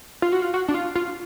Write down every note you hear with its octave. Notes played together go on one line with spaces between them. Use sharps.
F4
F#4
F4
F#4
D4
F4
F4